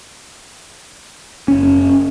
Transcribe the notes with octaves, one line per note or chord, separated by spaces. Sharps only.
F#1 C#4